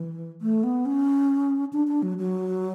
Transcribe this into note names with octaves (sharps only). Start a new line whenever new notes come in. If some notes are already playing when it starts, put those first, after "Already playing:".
Already playing: E3
A3
B3
C#4
D4
D4
F#3
F#3